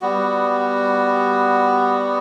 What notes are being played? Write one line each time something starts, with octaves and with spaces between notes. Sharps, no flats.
G3 B3 F#4